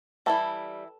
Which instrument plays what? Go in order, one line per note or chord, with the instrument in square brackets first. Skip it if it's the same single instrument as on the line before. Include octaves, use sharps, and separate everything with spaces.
[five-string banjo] E3 G3 E4 A4